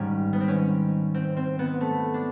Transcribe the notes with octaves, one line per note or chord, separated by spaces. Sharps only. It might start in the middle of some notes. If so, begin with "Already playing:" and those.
Already playing: G#2 D#3 G3 C#4
B3
C4
C#4
C4
C4
B3
A3
D4